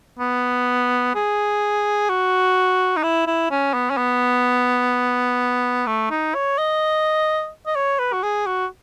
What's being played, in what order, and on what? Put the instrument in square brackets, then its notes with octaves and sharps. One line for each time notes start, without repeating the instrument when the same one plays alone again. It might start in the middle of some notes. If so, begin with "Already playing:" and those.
[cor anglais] B3
G#4
F#4
D#4
E4
E4
C#4
B3
C#4
B3
A3
D#4
C#5
D#5
D#5
C#5
B4
F#4
G#4
F#4